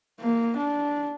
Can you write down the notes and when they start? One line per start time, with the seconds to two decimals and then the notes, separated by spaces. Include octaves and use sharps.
0.20 A#3
0.57 D4